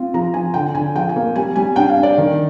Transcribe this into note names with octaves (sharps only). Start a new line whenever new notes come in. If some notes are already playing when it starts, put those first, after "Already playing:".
Already playing: C4 F4
F3 A#5
F3 G#5
D3 G5
D3 G#5
F3 G5
G#5
A#3
G3 G#5
G3 G#5
D4 G5
F5
D4
D5
D#3